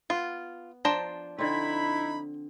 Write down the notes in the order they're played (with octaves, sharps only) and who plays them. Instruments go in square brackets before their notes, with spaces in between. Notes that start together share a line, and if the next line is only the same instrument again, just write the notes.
[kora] B3 [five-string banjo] F4
[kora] F3 [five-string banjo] D4 C5 A#5
[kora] D3 C4 [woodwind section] D#4 E4 B5